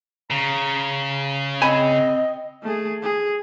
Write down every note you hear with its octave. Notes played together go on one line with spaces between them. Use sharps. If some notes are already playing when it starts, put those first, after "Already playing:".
C#3 A#5
C4 D#5 G#5 B5
A3 G#4
G#4